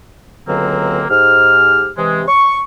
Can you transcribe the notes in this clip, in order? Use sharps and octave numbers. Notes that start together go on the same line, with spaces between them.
C#2 B2 D3 F#3 A#3 C4
G#2 G4 F6
C3 E3 G#3
C#6